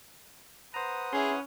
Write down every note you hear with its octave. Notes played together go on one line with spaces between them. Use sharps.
B4 C5 F#5 A#5 D#6
C#4 E4 G#4 C6